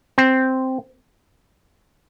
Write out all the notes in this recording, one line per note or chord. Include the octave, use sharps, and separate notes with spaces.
C4